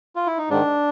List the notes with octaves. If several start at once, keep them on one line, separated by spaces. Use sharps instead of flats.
F4
E4
D#4
G#2 D#3 D4